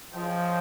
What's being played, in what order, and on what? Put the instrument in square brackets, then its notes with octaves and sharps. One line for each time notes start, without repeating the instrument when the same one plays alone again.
[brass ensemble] F3 [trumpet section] C#4 G#4 D#5 G5